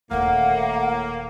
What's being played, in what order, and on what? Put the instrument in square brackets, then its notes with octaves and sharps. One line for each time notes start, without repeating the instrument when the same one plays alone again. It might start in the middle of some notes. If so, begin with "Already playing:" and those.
[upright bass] D#1 D#3 [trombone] A2 [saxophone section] A#3 [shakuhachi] F#5